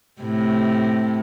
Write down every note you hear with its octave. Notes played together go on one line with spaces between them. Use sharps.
A2 C3